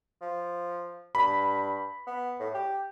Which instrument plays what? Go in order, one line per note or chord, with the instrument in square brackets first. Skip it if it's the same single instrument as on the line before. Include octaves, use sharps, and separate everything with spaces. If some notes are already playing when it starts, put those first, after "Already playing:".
[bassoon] F3
[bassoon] G2 [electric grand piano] B5
[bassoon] B3
A2
G4